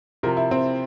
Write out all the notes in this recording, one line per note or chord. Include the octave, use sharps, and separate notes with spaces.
C3 F3 A#4
E4
C4